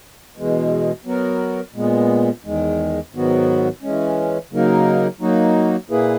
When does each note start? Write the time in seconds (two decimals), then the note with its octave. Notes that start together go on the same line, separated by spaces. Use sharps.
0.36 E2 B2 G#3
1.05 F#3 B3 F#4 A#4
1.74 A#2 G#3 B3
2.44 E2 D#3 G#3
3.13 G#2 D#3 F#3 B3 F#4
3.83 E3 G#3 C#4
4.51 C#3 F#3 A#3 D#4 A#4
5.21 F#3 A#3 D#4 F#4
5.90 A#2 A#3 E4 G#4 B4